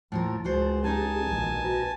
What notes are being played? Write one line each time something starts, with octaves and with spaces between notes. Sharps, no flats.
D#2 A2 F3 A#4 A5
C#2 F#4 G#4 C5
C#4 D#4 G4 G#4 A#4 G#5 A5
A#1 B2 D#3 E3
F#4 B4 A#5